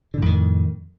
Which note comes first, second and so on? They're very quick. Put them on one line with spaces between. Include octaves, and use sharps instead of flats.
D3 A2 F2 D#3